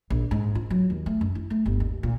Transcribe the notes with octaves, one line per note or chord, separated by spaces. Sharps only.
A#1
G#2
F4
F#3
D#2
A3
F#2
E4
A3
G1
D#2
A#2